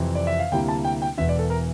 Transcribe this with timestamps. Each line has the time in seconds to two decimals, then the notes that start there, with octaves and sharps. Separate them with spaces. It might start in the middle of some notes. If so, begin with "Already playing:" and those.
Already playing: F2 C3 E3
0.15 D5
0.27 E5
0.39 F5
0.51 D2 C3 G3 A#3 E4 G5
0.68 A5
0.85 G5
1.02 G5
1.18 E1 E2 E3 E5
1.29 D5
1.39 A4
1.50 A#4